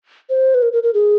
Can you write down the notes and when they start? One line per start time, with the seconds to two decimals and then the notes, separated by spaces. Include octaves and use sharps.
0.30 C5
0.54 B4
0.62 A#4
0.73 A#4
0.83 A#4
0.94 G#4